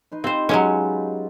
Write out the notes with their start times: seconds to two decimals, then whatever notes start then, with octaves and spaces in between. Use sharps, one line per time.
0.12 D#4 B4 C6
0.24 C4 F4 G4 C5 D#5
0.49 F#3 G#3 C#4